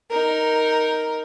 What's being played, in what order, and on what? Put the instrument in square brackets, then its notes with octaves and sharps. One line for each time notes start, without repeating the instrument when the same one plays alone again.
[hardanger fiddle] D#4 A#4